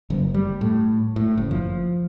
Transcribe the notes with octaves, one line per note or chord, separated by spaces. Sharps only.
F#1
G3
A2
A2
F#1
F3